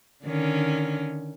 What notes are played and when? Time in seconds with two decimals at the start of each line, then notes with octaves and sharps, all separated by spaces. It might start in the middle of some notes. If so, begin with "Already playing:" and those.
0.24 D3 D#3 C#4